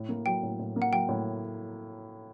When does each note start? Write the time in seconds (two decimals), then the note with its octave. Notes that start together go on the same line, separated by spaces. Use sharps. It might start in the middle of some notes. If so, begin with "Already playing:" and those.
Already playing: A2
0.09 A#3
0.26 F#3 G5
0.43 A2
0.59 A2
0.76 A#3
0.82 F#5
0.93 F#3 G5
1.09 A2